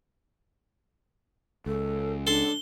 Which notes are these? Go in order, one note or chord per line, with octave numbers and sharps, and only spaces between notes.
C#2 A4
D4 A4 C6 G7